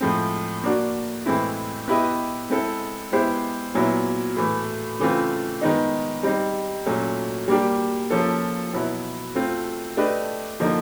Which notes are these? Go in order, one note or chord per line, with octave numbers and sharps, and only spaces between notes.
A2 F3 G#3 C4
A#3 D4 F#4
A2 E3 G#3 C4 E4
B3 E4 G4 B4 D#5
G#3 C4 E4 A4
G#3 B3 E4 G4 C5
A#2 F#3 B3 E4
A2 E3 A3
C#3 E3 A3 C4 F4
D#3 G#3 B3 D#4
G3 C4 D#4
A#2 F#3 A3 C#4
G3 A#3 D4 G4
F3 A#3 C#4 F4 A4
B2 F#3 B3 E4
A3 C4 F4
A3 D4 G4 B4 D#5
D3 F3 A#3 D#4